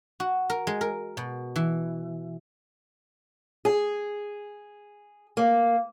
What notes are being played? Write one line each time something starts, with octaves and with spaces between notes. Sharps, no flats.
F#4
A#4
G#3
A#4
B2
E3
G#4
A#3